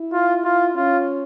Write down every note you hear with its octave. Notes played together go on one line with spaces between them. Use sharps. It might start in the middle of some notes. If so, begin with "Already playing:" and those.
Already playing: E4
F4
F4
C#4 F4